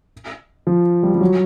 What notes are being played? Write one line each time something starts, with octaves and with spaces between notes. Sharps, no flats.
F3
G3
G3
F#3